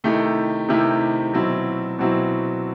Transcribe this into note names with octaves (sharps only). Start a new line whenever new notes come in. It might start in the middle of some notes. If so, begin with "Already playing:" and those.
C3 D#3 A3 E4 G4
C3 D#3 A3 E4 G4
B2 F#3 C4 E4
B2 F#3 C4 E4